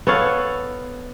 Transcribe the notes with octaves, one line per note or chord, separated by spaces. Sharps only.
B3 A4 C#5 F5